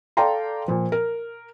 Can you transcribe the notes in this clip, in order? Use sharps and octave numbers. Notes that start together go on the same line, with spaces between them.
A4 D5 F5 G5 A#5 C6
A#2 F3
A#4